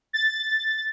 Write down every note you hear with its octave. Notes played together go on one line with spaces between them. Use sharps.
A6